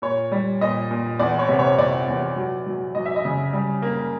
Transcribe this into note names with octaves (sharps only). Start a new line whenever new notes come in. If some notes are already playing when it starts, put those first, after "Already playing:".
A#2 C#5
G3
A#2 D#5
A#2
E2 D5
C#5
C3
C#5
C3 D5
E2
F#3
F#3
F#3 D#5
E5
D#5
C#3
G3
A#3